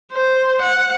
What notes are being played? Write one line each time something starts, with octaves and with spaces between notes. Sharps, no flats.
C5
F#5